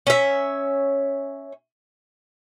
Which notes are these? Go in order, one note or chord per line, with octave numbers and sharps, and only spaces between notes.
C#4 E5